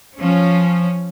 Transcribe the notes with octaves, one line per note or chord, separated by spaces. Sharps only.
F3 C#4